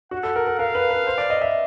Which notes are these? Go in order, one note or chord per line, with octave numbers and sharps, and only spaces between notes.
F#4 F#5
A4
A#4
A#4
A#4 F5
B4
B4
C5
D5
D#5
E5